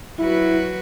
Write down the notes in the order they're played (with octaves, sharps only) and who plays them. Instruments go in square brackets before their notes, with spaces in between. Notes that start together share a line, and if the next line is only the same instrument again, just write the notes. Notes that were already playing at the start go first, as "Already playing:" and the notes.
[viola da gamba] F#3 F#4 B4 [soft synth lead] E4